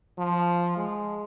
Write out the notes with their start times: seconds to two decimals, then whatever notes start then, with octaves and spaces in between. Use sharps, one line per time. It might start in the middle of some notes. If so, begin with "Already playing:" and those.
0.19 F3
0.77 G#3